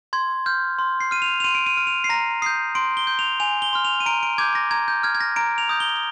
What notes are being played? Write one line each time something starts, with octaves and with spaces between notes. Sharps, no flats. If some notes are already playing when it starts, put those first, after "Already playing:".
C6 G#6
F6 G6
C6
C7
F6 D#7
F7
F7
C6 D#7
D7
D#7
F6
F7
C7
A#5 A#6
D#6 G6 C7
C6 D7
G7
G6
F7
G#5 F7
G7
C6 F6
F7
D#7
A#5 D7
D7
D6 G6 G#6
A#6
A#5 G#6
G6
F6 G#6
G#6
A#6
A#5 D7
F7
D#6 G6
G7